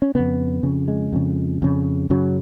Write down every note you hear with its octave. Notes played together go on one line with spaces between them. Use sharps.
C#4
F2 C#3 B3
F2 C#3
G#3
F2 C#3
F2 C#3
F#2 C#3 F#3